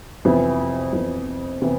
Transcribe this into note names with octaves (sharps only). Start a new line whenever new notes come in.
F2 C3 E3 B3 E4
F2 C3 E3 B3 E4
C3 E3 B3 E4